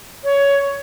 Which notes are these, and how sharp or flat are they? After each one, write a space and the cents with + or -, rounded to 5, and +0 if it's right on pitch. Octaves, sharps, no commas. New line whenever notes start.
C#5 +15